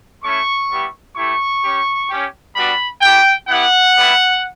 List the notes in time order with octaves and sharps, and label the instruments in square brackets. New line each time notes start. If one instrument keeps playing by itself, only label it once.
[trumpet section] A3 C#4 E4 C#6
G3 B3 E4 G4
A3 E4 G4 C#6
C#4 G4
C#4 G4
G3 B3 D4 F#4 B5
A3 E4 G4 G5
B3 E4 G4 F#5
G3 B3 E4